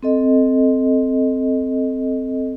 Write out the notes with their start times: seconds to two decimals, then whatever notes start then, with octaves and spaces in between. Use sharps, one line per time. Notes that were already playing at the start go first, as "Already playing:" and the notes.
0.03 C4 A4 D#5